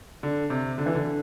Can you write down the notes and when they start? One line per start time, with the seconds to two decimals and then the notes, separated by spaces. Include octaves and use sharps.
0.23 D3
0.50 C3
0.78 D3
0.86 E3
0.95 D3
1.05 D3